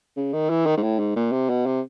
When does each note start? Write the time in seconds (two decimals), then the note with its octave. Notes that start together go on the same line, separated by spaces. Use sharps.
0.17 C#3
0.34 D#3
0.50 E3
0.66 D#3
0.78 G#2
0.83 A2
0.99 G#2
1.16 A#2
1.32 C3
1.50 B2
1.66 C3